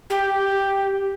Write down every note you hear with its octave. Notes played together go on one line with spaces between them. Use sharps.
G4